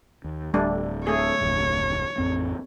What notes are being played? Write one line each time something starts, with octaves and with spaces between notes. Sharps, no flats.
D#2
D1 G3 A3 D4
A3 G#4 C#5
F1 D2 A2
A1 F2 C4